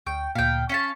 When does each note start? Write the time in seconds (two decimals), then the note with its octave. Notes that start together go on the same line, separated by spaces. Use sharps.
0.07 D2 G5 C#6
0.35 D2 A#2 F5 G5
0.69 C#4 F5 A5 B6 C#7